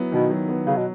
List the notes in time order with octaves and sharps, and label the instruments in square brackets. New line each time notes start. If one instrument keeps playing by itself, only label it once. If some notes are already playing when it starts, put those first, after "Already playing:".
Already playing: [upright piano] F#3 B3 E4
[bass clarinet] B2 [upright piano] D#3
[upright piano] F#3
B3
[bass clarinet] C#3 [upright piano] F#3
[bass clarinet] B2